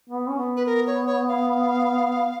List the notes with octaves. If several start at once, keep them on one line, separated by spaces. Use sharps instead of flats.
B3
C#4
B3
B4
A#4
C#5
C#5
F5